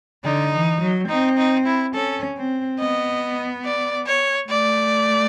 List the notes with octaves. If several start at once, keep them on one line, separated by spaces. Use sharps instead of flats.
D3 D#4
E3
F#3
C4 D#4
D#4
E4
C#4 A4
C4
B3 D#5
D5
C#5
A3 D5